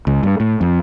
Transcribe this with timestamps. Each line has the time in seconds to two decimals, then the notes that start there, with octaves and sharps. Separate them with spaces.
0.07 C#2
0.23 G2
0.40 A2
0.61 F2